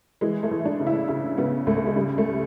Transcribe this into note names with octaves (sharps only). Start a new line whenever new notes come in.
E3 G#3
A3
E3
D4
C#3
E4
C#3 E4
C#3 B3
C#2 A3
A3
G#3
C#3 G3
A3